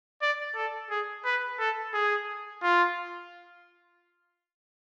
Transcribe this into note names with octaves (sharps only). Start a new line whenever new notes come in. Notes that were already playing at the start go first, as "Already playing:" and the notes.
D5
A4
G#4
B4
A4
G#4
F4